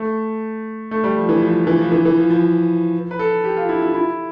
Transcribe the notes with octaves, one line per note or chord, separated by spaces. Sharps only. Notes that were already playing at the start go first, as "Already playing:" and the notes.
Already playing: A3
A3
G3
F3
E3
F3
E3
F3
E3
E3
F3
F3
B4
A4
G4
F4
E4
E4
E4